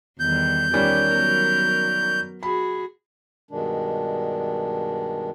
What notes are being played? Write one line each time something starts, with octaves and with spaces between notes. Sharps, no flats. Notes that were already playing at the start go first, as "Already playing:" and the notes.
E2 D#3 G3 G6
D#3 G3 C#4 F4 G4
F#3 B3 A#4
F#4 G#4 B5
G2 B2 D#3 G#3 D4